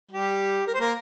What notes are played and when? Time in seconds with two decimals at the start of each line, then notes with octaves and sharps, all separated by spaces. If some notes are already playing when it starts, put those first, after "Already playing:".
0.11 G3 G4
0.67 A#4
0.74 C5
0.80 A#3 A#4